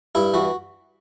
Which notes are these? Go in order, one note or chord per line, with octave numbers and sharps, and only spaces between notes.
G2 E4
E3 F#4